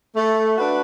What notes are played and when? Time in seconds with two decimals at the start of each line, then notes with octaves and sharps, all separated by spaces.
0.16 A3
0.58 D4 F#4 B4